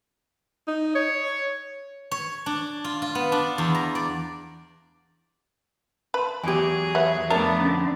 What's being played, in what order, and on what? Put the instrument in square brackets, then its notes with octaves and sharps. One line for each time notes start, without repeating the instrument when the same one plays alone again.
[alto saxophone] D#4
C#5
[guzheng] C#5
D4
F4
F4
B3
D4
E2
A#5
D5
[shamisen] B4 [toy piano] A5 A#5 C6
[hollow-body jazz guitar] E2 G4 [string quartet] F#3 G#4 [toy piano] G#5
[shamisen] B3 [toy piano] C#5 E5
[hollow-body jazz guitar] F2 A5 [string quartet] A3 B3 D4 [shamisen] A#4
[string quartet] D3 [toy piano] C#4